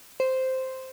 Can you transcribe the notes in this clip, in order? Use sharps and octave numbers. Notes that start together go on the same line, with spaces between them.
C5